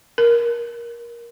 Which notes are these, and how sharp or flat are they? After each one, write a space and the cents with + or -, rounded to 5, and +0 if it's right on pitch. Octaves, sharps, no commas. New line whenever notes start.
A#4 +15